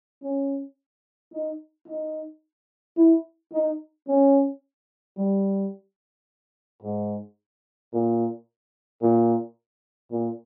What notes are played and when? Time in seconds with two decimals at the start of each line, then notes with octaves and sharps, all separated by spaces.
0.22 C#4
1.33 D#4
1.88 D#4
2.97 E4
3.52 D#4
4.08 C#4
5.17 G3
6.82 G#2
7.92 A#2
9.02 A#2
10.11 A#2